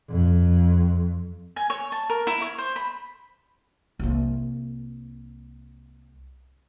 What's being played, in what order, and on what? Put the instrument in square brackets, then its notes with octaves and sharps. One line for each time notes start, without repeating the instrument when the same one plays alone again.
[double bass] F2
[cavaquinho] G#5
C#5
A5
A#4
E4
C#5
C5
B5
[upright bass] C2 A#3